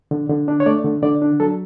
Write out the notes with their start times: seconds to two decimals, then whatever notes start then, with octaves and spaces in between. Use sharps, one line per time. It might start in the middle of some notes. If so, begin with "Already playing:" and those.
0.11 D3
0.29 D3
0.48 D4
0.60 C#5
0.66 A3 D5
0.85 D3
1.03 D3 D5
1.22 D4
1.40 F#3 A4